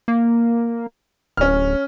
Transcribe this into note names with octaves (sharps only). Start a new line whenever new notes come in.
A#3
D1 C#4 F6